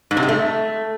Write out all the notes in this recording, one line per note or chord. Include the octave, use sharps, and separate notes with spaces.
G#2
C3
G#3
A3